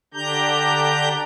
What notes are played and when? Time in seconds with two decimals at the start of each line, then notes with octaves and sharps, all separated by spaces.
0.14 D3 D4 G4 A#5 G6